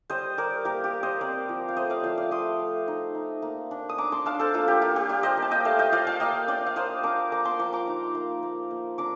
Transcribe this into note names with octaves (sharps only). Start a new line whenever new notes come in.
G3 C5 D#5
G3 A#4 D5
A#3 G4 A#4
G4
A#3
C5 D#5
C4 A#4 D5
F3
F5
A3 C5 D#5
D5 F5
F3 D5 F5
D5 F5
A3 C6 D#6
A3
D#4
D#4
A#3
D4
D#6
D4 A#5 D6
A5 C6
D4 F5 A5
A4 C5
A#3 F4 A4
G4
A#3 F4
G4
G3 G4
C5 D#5
A#3
A5
D#5 G5
A3 F5 A5
D#5 G5
F4 D5 F5
F5 A5
A#3 D#5 G5
D4 D5 F5
F5
A#3 C5 D#5
D4 A#5 D6
A#3 A#5 D6
A5 C6
F3 A#5 D6
A#5 D6
D#4
A#3
A#3
A#3
D4 A#5 D6